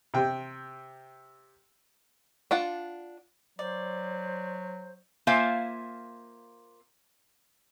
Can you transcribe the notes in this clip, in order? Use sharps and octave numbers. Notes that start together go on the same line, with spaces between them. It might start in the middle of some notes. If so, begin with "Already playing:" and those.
C3 G5
D4 F4 F#5
F#3 C5 D5
A#3 F4 C5 E5 F5 G#5